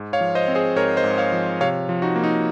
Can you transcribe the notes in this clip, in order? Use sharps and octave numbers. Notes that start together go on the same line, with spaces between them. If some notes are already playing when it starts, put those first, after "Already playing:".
Already playing: G#2
C#5 F5
F3
C5 D#5
C4
G#4 C5
G#2 A#4 C#5
C5 D#5
G#2
C#5 F5
F3
C3 C#5 F5
F3
D#4 F#4
A#3
D#4